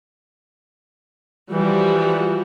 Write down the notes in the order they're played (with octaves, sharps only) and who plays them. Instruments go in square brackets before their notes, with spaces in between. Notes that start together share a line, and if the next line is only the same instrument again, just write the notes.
[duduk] E3 [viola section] F3 G3 F#4